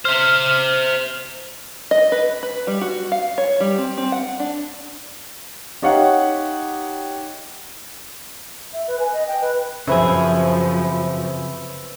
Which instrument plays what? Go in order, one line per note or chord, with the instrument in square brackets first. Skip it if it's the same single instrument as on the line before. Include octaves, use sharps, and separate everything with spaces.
[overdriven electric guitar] C5 E5 [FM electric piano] F6
[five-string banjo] D#5
B4
B4
G3
F#4
F5
C#5
G3
C4
C4
F#5
D4
[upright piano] D#4 G4 C#5 F5 F#5
[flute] E5
B4
G#5
D#5
G5
B4
[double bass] F#2 F3 [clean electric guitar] C#3 C4 G#4 [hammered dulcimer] B4 C5 E5